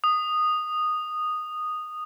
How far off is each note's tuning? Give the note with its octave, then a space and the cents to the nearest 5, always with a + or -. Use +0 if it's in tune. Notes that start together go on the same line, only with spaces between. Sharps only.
D#6 -10